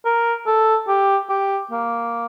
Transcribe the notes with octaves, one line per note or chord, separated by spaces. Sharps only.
A#4
A4
G4
G4
A#3